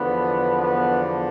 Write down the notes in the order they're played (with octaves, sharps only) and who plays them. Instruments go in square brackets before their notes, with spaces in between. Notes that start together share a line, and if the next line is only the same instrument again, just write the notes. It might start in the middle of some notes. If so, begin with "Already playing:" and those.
Already playing: [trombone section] E2 D3 F3 [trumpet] B3
[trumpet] B3